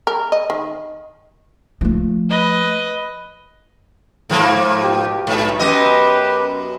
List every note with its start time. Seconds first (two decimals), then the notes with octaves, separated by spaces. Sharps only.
0.07 A#4
0.32 D#5
0.50 D#3
1.81 F3 A3
2.30 B4 D#5
4.30 G#2 F3 A#3
4.82 B2 G4
5.27 B1 G#2
5.59 F#2 B3 G4 B4 D#5